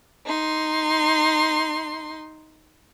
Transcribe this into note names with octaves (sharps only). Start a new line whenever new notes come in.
D#4 C6